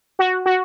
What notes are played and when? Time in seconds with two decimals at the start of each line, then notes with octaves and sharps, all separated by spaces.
0.19 F#4
0.46 F#4